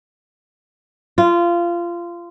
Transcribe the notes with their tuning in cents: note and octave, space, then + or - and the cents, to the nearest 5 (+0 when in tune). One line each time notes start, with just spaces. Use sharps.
F4 -20